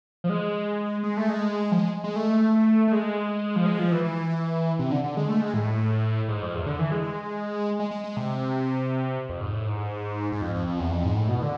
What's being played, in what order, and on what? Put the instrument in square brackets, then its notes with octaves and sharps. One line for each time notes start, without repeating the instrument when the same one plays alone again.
[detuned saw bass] F3
G#3
G#3
A3
G#3
F3
G#3
G#3
A3
A3
G#3
F3
G#3
F3
E3
E3
C3
D3
D3
G#3
A3
G#3
A2
G#2
F2
E2
D3
E3
G#3
G#3
G#3
G#3
C3
F2
G#2
A2
G#2
G#2
F2
F2
F2
E2
F2
G#2
A2
B2
D3